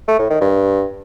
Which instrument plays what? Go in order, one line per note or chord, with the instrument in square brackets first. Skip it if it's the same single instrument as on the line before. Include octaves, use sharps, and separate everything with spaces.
[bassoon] A3
A2
D#3
G2